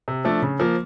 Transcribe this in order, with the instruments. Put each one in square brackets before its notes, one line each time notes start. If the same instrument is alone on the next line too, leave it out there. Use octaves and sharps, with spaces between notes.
[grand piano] C3
F3 A3 D4
C#3
F3 A#3